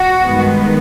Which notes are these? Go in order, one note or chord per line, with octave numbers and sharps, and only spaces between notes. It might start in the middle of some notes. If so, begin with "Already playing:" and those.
Already playing: F#4
G2 D#3 G#3 B3